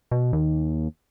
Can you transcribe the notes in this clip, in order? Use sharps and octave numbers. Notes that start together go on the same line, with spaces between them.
B2
D#2